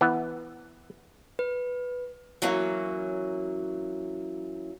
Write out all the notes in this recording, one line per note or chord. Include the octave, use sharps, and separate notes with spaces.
E3 B3
B4
E3 F#3 A#3 C#4